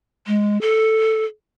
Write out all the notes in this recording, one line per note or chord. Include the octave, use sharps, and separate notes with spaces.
G#3
A4